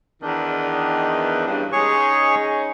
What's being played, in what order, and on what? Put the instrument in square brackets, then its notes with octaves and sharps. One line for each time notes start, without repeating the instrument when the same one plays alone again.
[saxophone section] E2 D#3 [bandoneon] D4
[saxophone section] G2 C#3
[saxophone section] G#3 C#4 D#4 [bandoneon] G#4 C#5 C#6